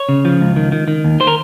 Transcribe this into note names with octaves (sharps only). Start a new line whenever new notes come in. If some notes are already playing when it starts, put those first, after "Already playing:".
Already playing: C#5
C#3
F3
C#2
D#3
D#3
D#3
D#2
C5
A#4